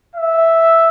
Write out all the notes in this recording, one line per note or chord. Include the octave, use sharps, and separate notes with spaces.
E5